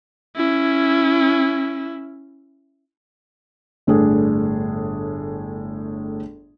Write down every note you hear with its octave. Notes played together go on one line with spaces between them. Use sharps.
C#4 E4
G1 A2 D4 G#4